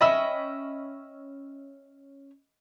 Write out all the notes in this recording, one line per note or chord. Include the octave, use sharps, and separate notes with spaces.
C#4 D#5 E5 G5 B5 E6